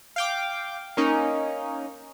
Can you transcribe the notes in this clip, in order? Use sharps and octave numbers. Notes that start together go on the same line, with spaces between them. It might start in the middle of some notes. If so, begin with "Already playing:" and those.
F5 G5 D6
A#3 C#4 D#4